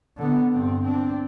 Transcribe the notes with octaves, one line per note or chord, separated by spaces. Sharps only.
D3 B3
G2 C4
C4 D4